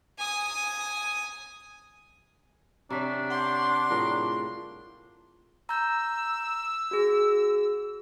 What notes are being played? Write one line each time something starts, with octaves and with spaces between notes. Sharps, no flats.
G#5 D#6
C3 C#4 D4 A#5 C#6 B6
F#5 C6 C#6 G6
A2 G3 F4 G#4 A#4
A#5 E6 G6
F#4 G#4